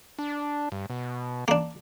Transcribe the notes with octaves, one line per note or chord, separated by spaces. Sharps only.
D4
G2
B2
A#3 D4